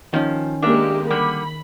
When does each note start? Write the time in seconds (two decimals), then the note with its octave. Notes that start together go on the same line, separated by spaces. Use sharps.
0.14 D#3 F3 C#4
0.62 G#3 A#3 D4 G4 A#4 E5
1.10 D3 G3 A#4 B5